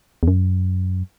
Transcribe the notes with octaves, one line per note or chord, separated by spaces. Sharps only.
E2
F#2